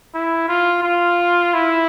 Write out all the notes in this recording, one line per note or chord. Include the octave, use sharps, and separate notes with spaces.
E4
F4
F4
E4